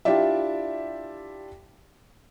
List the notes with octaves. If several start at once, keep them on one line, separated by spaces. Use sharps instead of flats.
D4 E4 F4 G4 D5 E5